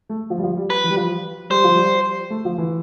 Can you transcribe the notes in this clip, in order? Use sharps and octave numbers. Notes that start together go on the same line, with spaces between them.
A3
F3
G3
F3
G3
B4
E3
G3
F3
G3 C5
F3
G3
A3
F3
E3